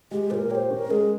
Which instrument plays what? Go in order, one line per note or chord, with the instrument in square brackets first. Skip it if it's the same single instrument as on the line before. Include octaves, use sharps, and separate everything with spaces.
[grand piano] G#3 [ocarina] G4
[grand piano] A#2 [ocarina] A#4 C5
[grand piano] G4 [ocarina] C5 C#5
[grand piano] C#4 [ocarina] A#4
[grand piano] G#3 [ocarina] G#4